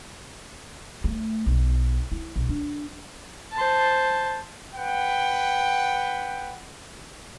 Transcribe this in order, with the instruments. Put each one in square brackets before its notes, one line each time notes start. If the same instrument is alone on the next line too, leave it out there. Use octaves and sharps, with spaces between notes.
[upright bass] A3
B1
E4
B1
D4
[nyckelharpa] C5 A5
[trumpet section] B4 F#5 G5